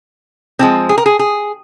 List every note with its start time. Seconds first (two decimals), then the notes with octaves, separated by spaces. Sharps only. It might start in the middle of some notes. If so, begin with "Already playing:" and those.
0.59 D3 F3 G#3 C4
0.89 G#4
0.98 A#4
1.06 G#4
1.19 G#4